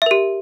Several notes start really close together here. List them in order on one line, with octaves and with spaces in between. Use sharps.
E5 A#4 G4